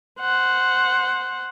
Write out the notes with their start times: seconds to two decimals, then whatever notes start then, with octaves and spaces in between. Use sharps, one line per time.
0.20 C5 F#5